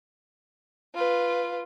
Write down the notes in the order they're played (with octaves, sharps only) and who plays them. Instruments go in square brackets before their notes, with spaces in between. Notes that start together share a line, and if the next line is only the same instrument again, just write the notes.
[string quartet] F4 B4